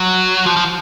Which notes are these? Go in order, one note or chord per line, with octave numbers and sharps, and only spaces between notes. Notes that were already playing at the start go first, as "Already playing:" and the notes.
Already playing: F#3
F3
F3